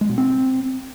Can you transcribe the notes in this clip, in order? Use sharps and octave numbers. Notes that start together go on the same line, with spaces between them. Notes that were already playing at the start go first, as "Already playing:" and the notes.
G#3
B2
C4